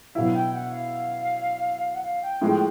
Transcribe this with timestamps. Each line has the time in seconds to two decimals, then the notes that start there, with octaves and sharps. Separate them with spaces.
0.15 B2 F#3 B3 E4 F5
0.34 G5
0.53 F#5
0.72 F5
1.94 F#5
2.03 F5
2.22 G5
2.41 A2 F3 G#3 G5